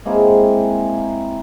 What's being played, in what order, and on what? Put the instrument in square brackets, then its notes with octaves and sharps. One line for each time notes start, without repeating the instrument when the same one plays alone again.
[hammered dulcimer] G#3 A#3 C4 E4